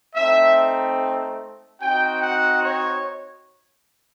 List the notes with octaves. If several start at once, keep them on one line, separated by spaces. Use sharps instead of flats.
A3 C4 D#4 E5
C4 D#4 F#4 G5
F#5
C#5